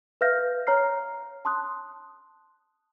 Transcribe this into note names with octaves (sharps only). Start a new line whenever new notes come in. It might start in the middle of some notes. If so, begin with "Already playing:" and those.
B4 E5 F5 F6 G6 A#6
C#5 A#5 F6 C7
A5 C6 D#6 F#6